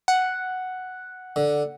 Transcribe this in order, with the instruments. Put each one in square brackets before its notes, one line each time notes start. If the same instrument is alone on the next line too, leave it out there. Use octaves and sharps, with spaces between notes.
[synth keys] F#5
[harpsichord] D3